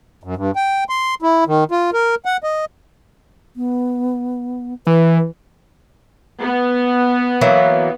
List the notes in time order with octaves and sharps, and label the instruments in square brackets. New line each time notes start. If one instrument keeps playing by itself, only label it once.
[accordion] F#2
G2
G5
C6
E4
D#3
F4
A#4
F#5
D#5
[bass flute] B3
[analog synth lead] E3 [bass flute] B4
[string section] B3
[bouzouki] E3 F#3 A#3